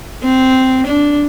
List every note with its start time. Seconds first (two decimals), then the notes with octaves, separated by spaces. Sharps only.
0.24 C4
0.87 D4